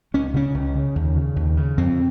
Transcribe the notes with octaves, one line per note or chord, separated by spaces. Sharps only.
C#2 C#4
C#3 C#4
C#2
C#3
D#2
C#3
D#2
C#3
F2 C4